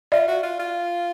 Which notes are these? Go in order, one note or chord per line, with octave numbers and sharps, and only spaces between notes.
F4 D5 E5
F#4
F4
F4